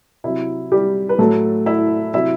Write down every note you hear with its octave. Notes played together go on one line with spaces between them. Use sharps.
C3 F#3 E4
G3 G4
B4
A2 F#3 A3 A4
E4 E5
C3 F#3 E4 E5